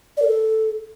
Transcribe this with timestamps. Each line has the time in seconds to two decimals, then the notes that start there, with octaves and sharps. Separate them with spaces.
0.17 D5
0.22 A#4
0.27 A4